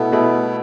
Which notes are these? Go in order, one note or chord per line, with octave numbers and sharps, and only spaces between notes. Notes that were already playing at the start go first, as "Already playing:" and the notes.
Already playing: B2 A3 B3 E4
B2 A3 E4